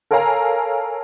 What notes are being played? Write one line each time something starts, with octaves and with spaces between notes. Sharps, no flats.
A4 A#4 C#5 F5 G#5 A#5